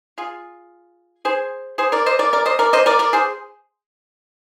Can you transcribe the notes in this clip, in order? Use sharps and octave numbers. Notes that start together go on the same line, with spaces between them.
F4 G#4
G#4 C5
G#4 C5
A#4 D5
C5 D#5
A#4 D5
A#4 D5
C5 D#5
A#4 D5
C5 D#5
A#4 D5
A#4 D5
G#4 C5